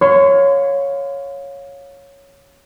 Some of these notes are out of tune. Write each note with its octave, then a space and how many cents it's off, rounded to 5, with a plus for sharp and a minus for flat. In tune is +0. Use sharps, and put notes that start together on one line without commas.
C#5 +0 F5 +20 C6 -35